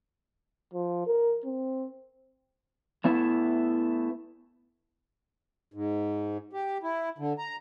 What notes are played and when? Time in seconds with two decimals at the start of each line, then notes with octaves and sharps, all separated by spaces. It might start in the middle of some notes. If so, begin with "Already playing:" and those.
0.74 F3
1.07 A#4
1.46 C4
3.04 A3 B3 E4 E5
5.74 G#2
6.53 G4
6.83 E4
7.18 D3
7.39 A#5